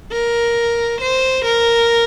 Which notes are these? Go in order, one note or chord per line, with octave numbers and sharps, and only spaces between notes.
A#4
C5
A#4